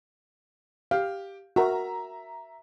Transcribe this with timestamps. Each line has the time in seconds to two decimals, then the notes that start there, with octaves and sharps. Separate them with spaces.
0.91 G4 F5
1.56 F#4 A#4 E5 A#5